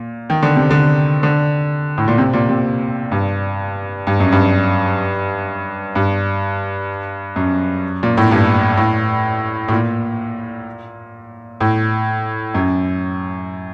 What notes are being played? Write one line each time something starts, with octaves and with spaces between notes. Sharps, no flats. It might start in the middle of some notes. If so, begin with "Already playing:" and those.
Already playing: A#2
D#3
D3
C3
D3
D3
A2
A#2
C3
A#2
C3
G2
G2
F#2
G2
G2
F#2
A#2
A2
G2
A2
A2
A#2
A2
F#2